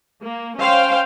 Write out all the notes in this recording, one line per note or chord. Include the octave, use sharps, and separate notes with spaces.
A#3
C#4 C5 F5 G5